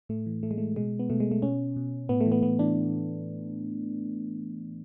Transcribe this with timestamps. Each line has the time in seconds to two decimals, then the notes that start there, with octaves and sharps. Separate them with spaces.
0.09 A2 A3
0.26 E3
0.43 A2 A3
0.51 G#3
0.58 E3 A3
0.76 B2 G#3
0.99 B3
1.10 B2 A3
1.20 G#3
1.31 A3
1.42 B2 C#4
1.76 B2
2.09 A2 B3
2.21 A3
2.26 E3
2.32 B3
2.43 A2 B3
2.59 E3 D4